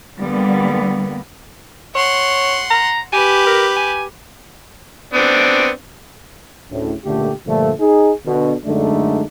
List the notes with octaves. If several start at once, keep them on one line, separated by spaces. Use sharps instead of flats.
D3 G3 A#3 B3
C#5 F#5 C6
A#5
G4 B4 G#5
A#4
G#5
B3 C4 D4
D2 A2 C#3
C#2 A#2 D3 A3 G4
G2 A#2 D3 F3 A3
D#4 G#4
B2 D3
F#2 D3 G#3 A3 D4 D#4